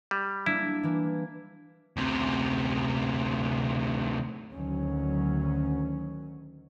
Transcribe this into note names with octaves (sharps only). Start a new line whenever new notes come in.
G3
G3 A#3 D4 E4
E3 A#3
D2 C3
D2 D#3 F#3 C#4